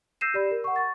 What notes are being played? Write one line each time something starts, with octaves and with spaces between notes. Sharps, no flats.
E6 G6 A#6 C7 D#7 E7
G4 D5 B5
A#4
F#5 C#6
C#6 A6